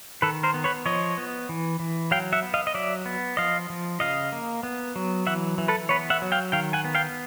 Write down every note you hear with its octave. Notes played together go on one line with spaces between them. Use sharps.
D#3 A4 B4
A#4 C5
B3
B4 C#5
F3 C#5 D#5
B3
E3
E3
F#3 F5 G5
E5 F#5
B3
D#5 F5
D#5
F#3 D5 E5
B3
F3 D#5 F5
F3
C#3 D#5 F5
A#3
B3
F#3
E3 E5 F#5
E3
A4 B4
B3 B4 C#5
E5 F#5
F#3
F5 G5
D#3 F5 G5
F#5 G#5
B3
F5 G5